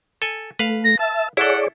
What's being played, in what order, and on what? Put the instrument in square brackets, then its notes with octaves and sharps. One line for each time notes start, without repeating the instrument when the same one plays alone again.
[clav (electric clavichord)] A4 G#5
[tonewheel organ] A3 [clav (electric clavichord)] B4 F5
[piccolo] A#6
[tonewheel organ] E5 [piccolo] A5
[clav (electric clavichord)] E4 A4 [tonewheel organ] G#4 C#5 D5 [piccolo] F#5